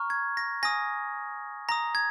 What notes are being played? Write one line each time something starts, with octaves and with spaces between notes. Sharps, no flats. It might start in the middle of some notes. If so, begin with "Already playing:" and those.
Already playing: A#5 C#6 F6
G#6
A#6
G#5 D#6 A#6
A#5 D#6 A#6
G#6